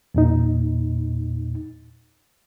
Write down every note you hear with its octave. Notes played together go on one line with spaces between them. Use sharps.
E2 A#2 D#4